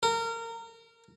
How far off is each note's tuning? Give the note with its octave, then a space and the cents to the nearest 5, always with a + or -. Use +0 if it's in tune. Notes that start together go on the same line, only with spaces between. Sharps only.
A#4 -25